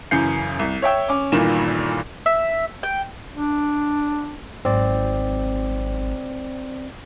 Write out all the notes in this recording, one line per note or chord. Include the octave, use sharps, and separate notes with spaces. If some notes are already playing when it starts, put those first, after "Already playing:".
F#2 C#3 E3 G6 C7 C#7
C2
C#5 E5 G5 E6
C#4 D6
G1 G2 A#2 D#3 E3 E7
E5
G5
D4
G#1 F#3 C4 D5